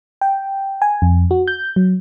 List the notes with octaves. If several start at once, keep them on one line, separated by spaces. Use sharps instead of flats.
G5
G#5
F2
F#4
G6
F#3